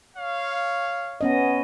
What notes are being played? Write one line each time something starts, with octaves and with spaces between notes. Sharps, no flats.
C#5 F5
B3 C#4 D#5